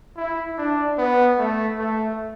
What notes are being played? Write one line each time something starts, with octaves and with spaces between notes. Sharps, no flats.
E4
D4
B3
A3
A3